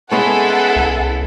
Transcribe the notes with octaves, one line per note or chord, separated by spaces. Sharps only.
G#3 B3 C#4 E4 G#4 A4 F#5
C2